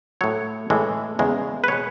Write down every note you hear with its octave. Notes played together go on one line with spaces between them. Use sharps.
A2 F#3 C#5
A2 E3 G#3
E2 C#3 G#3
B4
B2 G#3 C#5